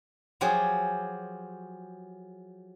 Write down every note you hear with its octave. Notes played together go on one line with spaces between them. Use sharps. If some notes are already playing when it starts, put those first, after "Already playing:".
F3 F#3 G4 G#4